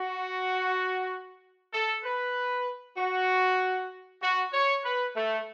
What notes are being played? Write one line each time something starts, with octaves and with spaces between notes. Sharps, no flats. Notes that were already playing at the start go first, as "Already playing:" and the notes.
Already playing: F#4
A4
B4
F#4
F#4
C#5
B4
A3